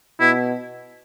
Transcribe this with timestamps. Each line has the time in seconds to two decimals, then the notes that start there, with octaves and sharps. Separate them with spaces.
0.20 B2 E4